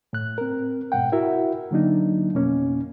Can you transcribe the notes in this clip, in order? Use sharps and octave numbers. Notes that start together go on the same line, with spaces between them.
A2 F#6
C4 A#4
G#2 B2 F#5 G5
E4 F#4 A#4 E5
D3 F#3 A#3 D4 D#4
F2 B2 A#3 C#4